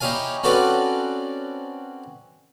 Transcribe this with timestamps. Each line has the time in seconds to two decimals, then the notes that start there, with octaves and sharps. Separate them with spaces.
0.01 D#4 E4 G4 C#5 F5 G#5
0.43 C4 C#4 F#4 A4 B4 D5